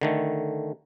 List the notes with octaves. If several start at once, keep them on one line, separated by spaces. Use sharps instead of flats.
D3 D#3 A3